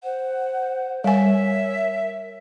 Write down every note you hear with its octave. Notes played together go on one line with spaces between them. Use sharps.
C5 F#5
G3 A#4 C#5 E5 G#5